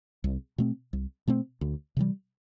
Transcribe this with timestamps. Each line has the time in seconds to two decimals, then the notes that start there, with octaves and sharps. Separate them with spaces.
0.24 C2
0.58 B2 A3 C4
0.93 C2
1.27 B2 A3 C4
1.61 D2
1.97 C3 E3 G3